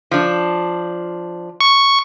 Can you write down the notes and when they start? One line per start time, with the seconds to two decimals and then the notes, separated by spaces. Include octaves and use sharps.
0.11 F3 D4
1.60 C#6